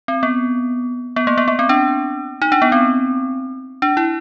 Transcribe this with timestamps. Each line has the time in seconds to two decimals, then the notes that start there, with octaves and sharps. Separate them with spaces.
0.08 C4
0.23 B3
1.16 B3
1.27 A#3
1.38 B3
1.48 B3
1.59 C4
1.69 D4
2.42 D#4
2.52 D4
2.62 B3
2.72 C4
3.82 D4
3.97 E4